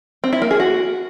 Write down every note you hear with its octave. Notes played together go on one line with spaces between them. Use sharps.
C4
E4
A#3
G#4
F#4